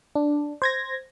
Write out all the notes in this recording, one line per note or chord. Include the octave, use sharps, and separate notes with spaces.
D4
C5 G#6 A#6